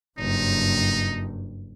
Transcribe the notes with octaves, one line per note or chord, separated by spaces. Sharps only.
F#1 G2 D#4